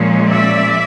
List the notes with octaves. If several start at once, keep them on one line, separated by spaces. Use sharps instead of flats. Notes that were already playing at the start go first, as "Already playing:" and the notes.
Already playing: A#2 F3 G#3 C#4
D5 E5